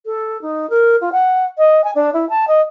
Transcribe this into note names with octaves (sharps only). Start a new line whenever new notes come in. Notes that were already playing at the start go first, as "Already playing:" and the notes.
A4
D#4
A#4
F4
F#5
D#5
G#5
D4
E4
A5
D#5